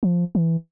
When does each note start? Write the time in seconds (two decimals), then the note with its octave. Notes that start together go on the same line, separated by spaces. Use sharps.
0.03 F3
0.35 E3